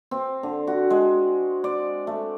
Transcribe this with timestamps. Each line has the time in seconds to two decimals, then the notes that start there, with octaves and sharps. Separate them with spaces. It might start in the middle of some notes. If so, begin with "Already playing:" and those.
0.11 C4
0.43 D3
0.67 F#4
0.90 G#3
1.64 D5
2.07 A3